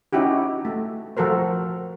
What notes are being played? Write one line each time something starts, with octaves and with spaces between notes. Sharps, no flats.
C#4 D#4 E4 F#4 G4
A3
F3 F#4 A4 A#4 C5